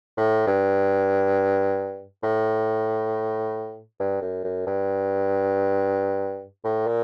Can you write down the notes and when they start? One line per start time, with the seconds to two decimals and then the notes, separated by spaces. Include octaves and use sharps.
0.17 A2
0.47 G2
2.23 A2
4.00 G2
4.22 F#2
4.44 F#2
4.66 G2
6.64 A2
6.86 A#2